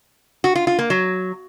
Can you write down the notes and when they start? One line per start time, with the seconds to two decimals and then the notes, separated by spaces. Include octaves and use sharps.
0.44 F#4
0.55 F4
0.67 F4
0.79 A#3
0.90 F#3